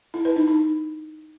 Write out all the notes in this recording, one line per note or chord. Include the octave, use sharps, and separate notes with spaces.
E4
B4
D#4
D#4